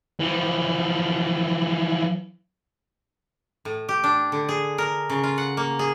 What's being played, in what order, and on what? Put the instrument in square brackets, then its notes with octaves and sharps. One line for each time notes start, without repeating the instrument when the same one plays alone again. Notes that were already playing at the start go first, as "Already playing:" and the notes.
[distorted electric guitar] E3 F3
[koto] A2
G4
D4
D3
G#4
A#4
C#3
F4
F#5
A#3
G#4